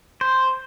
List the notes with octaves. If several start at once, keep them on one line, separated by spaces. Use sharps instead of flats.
C5